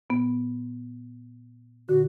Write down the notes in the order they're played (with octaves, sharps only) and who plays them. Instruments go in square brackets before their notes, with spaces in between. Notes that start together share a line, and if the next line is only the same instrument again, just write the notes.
[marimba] A#2 B3
[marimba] A#2 D3 [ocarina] F#4